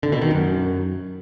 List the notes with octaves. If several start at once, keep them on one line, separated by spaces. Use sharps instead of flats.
D3
B2
D#3
F#2